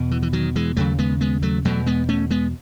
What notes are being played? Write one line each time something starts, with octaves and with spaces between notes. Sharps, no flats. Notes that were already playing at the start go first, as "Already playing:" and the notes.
Already playing: E2 B2
E3
E3
D#3 F#3
E3 G#3
D#2 C#3 F#3 A3
G#3 B3
G#3 B3
F#3 A3
E2 B2 F#3 A3
G#3 B3
A3 C#4
G#3 B3